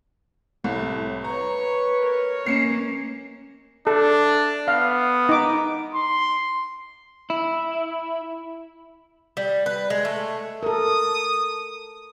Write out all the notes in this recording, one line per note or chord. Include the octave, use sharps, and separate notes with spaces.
C2 A2
B4 C#5 A#5 C#6
A#4 C#5
A#3 C#4 C7 C#7 E7
D4 A4
B3 F5
D#4 D6
C6
E4
G3
B4
G#3
A3
A4 A#4 D#6